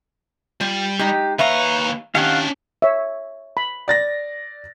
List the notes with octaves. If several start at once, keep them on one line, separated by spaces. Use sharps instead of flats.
G3 F4
G#3 D#4 G4
D#2 B4 C#5 E5 F5 A#5
D#3 C#4 D4 G4 F5 F#5
C#5 E5
B5
D5 A6 A#6